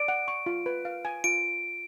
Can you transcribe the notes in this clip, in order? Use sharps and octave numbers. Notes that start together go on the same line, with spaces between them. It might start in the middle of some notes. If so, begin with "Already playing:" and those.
Already playing: D5 D7
F#5
C#6
F4
B4
F5
G#5
F4 D7